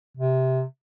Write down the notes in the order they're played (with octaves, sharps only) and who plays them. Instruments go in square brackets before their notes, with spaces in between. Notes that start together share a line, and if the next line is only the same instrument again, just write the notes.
[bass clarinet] C3